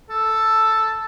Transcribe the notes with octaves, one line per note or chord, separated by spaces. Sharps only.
A4